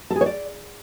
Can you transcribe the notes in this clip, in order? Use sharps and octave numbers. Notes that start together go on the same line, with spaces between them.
A4
G#4
C#5
D5